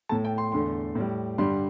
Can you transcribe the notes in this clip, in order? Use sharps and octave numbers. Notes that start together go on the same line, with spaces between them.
A2 A3 A5
G5
C6
E2 D3 A3 C6
A2 G3
G2 D3 G3 C6